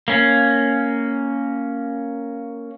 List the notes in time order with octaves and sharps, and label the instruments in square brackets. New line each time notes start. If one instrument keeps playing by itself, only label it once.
[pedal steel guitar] A#3 C#4